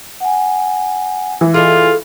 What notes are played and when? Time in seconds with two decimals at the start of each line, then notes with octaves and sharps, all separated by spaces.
0.20 F#5 G#5
1.41 E3
1.54 F4 G#4 A4 D#5